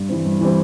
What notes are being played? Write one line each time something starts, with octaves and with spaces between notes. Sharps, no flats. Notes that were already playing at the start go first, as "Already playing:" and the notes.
Already playing: G2
E3 G3 C4
G2
E3 G3 C4